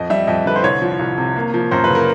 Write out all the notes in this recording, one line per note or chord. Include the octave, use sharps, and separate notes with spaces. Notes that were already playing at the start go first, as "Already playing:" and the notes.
Already playing: F2 D#5
G3 E5
F2 D#5
D3 B4
C5
C2 C#5
F3
C2
C3
A#3
F3
F#2 C5
B4
C#3
A#4